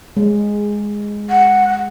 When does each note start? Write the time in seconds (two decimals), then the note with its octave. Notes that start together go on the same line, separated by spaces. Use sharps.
0.17 G#3
1.30 F#5